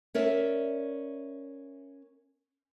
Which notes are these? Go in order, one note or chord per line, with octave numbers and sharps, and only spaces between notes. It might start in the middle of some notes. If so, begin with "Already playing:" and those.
C#4 A#4 D5 E5